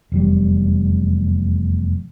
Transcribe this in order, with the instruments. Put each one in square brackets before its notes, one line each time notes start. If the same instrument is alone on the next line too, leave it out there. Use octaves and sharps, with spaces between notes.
[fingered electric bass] F1 E2 F#3 G3